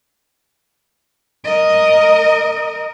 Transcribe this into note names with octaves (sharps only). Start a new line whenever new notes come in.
A#4 D#5